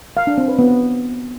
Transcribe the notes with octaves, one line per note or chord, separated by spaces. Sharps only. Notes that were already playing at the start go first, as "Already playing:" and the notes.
F5
D4
C4
B4
B3